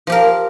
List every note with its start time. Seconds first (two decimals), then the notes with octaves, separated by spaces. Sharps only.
0.07 F3
0.10 G4
0.12 A#4